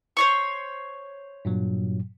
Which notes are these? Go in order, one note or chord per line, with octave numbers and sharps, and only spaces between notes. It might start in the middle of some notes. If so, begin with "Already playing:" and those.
C5 C#5 C#6
G2 A#2 F#3